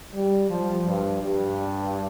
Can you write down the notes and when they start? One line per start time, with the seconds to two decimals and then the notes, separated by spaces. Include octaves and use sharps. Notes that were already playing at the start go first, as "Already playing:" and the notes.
0.14 G3
0.50 F3
0.86 G2
1.22 G2